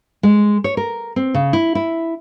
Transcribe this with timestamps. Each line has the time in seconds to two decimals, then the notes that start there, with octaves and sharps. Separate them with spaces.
0.23 G#3
0.64 C#5
0.77 A#4
1.16 C4
1.34 C#3
1.53 E4
1.75 E4